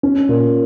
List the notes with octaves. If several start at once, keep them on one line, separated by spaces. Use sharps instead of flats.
C#4
A#2